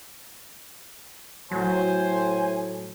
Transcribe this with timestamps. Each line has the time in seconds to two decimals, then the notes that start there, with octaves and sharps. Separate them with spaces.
1.52 A2 F#3 C5 G#5